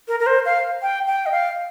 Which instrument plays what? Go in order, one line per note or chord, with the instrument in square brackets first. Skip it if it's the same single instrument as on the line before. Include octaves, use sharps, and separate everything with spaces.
[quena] A#4
A#4
C5
F5
G5
G5
D#5
F5